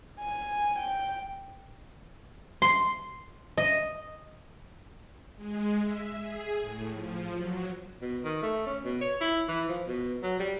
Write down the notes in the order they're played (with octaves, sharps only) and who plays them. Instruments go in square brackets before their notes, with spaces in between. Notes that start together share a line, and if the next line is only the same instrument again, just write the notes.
[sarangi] G#5
G5
[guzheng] C6
D#5
[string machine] G#3
E5
G#4
A2
F3
F#3
[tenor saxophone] B2
D#3
A3
C#4
B2
C#5
E4
E3
F3
B2
F#3
G3